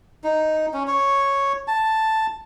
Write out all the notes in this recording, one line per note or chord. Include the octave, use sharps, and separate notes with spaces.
D#4
C#4
C#5
A5